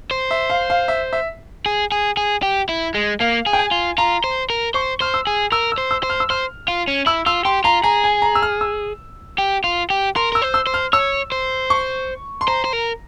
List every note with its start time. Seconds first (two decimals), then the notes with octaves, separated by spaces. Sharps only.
0.11 C5
0.31 E5
0.50 F5
0.70 F5
0.88 E5
1.13 E5
1.66 G#4
1.92 G#4
2.17 G#4
2.43 G4
2.69 E4
2.94 G#3
3.20 A#3 F5
3.46 G#4
3.53 G5
3.59 G#5
3.71 F4
3.98 F4 A#5
4.24 C5
4.50 A#4
4.74 C5 C#6
5.00 C5 F6
5.14 E6
5.27 G#4
5.52 A#4 E6
5.72 E6
5.78 C5
5.91 E6
6.03 C5
6.10 F6
6.20 E6
6.30 C5 F6
6.68 F4
6.88 C#4
7.06 E4 E6
7.26 F4 E6
7.45 G4 C6
7.64 F4 A#5
7.83 G#4 A#5
8.04 G#5
8.22 A#5
8.35 E6
8.42 F6
8.61 E6
9.38 G4
9.64 F4
9.90 G4
10.16 A#4 C6
10.32 A#4 E6
10.42 C5
10.54 E6
10.67 C5
10.74 F6
10.93 C#5 E6
11.32 C5
11.70 C#6
12.41 C6
12.47 C5 A#5
12.64 C5
12.73 A#4